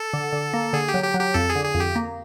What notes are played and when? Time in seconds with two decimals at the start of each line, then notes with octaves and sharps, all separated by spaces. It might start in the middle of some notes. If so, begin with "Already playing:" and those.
Already playing: A4
0.13 D3
0.33 D3
0.53 A#3
0.73 D3 G#4
0.88 G4
0.94 F#3
1.04 G4
1.14 F#3 G4
1.34 F2 A4
1.50 G#4
1.55 D3
1.65 G#4
1.75 F2
1.80 G4
1.96 A#3